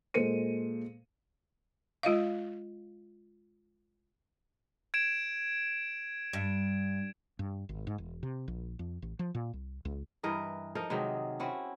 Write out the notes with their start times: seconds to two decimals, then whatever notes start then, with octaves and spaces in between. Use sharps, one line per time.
0.14 A#2 G#3 A4 C5 C#7 D#7
2.03 G#3 F4 D#5 F5
4.94 G#6 D7 E7
6.33 G2
7.39 G2
7.69 G#1
7.87 G#2
7.98 E1
8.23 C3
8.48 A#1
8.79 F2
9.02 A1
9.19 F3
9.35 A#2
9.53 C2
9.85 C#2
10.23 G2 E3 A#4 D#5
10.75 F3 D#4 A4 A#4
10.90 C3 D#3 F#3 G#3
11.40 C4 C#4 E4 F#4